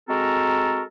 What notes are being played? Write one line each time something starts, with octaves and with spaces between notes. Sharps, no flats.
G#3 C4 F#4 A4 A#4 A#5